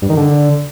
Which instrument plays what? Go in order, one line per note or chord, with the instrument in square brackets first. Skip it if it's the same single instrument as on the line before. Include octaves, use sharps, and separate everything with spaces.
[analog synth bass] G2
D#3
D3